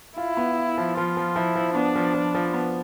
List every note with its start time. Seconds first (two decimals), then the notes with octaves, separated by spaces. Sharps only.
0.18 E4 F4
0.37 B3
0.58 F4
0.78 F3
0.97 F3 F4
1.17 F3
1.36 F3 E4
1.56 F3
1.75 B3 D4
1.96 F3
2.14 F3
2.35 F3
2.54 B3